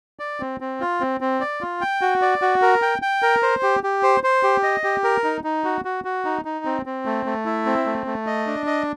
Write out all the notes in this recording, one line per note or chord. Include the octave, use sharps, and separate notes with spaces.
D5
C4
C4
F4
C4
C4
D5
F4
G5
F#4
D5
F#4
A#4
G5
G5
A#4
C5
G4
G4
C5
C5
G4
D#5
G4
A#4
D#4
D#4
F#4
F#4
F#4
D#4
D#4
C4
C4
A3
A3
E4
C4
A3
A3
D#5
D4
D#5